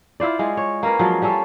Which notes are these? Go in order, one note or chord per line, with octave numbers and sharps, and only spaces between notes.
E4 F4 C5 D5
G#3 F4
C#5
A#3 C#4 A#4 B4
F3 F#3 G#3
G3 A#3 C#4 A4